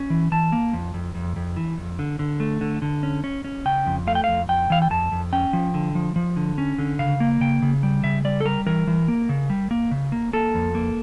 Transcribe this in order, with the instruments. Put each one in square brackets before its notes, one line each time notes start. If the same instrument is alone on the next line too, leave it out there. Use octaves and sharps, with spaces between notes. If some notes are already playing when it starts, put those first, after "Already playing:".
Already playing: [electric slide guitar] C#4
E3
E3 A5
A#3
F2
F2
F2
F2
E3
F2
D3
D3
A3
D3
D3
C#4
C#4
C#4
C#3 G5
F2
A3 F5
G5
F2 F5
F2 G5
E3 F5
G5
F2 A5
F2
C#4 G5
F3
D3
F3
F3
D3
C#4
D3
C#3 F5
A#3
C#3 G5
C#3
G3
C#3 E5
G3 D5
A4
G3 A#4
E3 A#4
E3
A#3
C#3
G3
A#3
C#3
A#3
A#3 A4
F2
A#3